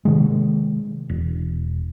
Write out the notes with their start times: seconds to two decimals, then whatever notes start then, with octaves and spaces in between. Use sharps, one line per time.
0.05 C3 D#3 G#3
1.09 E1